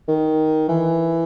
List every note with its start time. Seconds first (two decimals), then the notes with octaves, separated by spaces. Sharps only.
0.08 D#3
0.68 E3